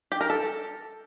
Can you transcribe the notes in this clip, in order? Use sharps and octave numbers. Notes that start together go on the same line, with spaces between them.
G4
A#4
A4